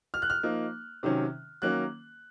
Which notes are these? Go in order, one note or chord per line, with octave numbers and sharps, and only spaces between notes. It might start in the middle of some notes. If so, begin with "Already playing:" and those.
F6
F#6
F6
F3 A#3 D#4
C3 D#3 F#3 C#4
D#3 F#3 A#3 C#4 F#6